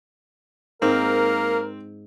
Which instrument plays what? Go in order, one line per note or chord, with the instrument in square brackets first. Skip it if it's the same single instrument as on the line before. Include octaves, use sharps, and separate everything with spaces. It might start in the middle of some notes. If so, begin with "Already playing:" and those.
[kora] G#2 [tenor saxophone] A#3 [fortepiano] C4 [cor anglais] A#4